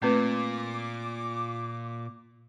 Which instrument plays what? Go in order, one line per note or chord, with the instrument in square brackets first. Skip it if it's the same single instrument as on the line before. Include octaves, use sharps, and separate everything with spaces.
[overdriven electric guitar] A#2 [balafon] A3 C4 B4 [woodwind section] F4 D6